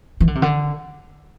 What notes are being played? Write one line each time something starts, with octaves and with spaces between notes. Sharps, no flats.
E3
D3
C3
D3